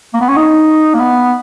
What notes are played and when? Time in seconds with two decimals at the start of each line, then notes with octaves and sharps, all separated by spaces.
0.14 A#3
0.21 B3
0.29 C#4
0.37 D#4
0.94 A#3
1.00 B3